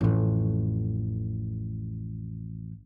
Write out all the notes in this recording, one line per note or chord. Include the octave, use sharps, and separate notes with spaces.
A1 F2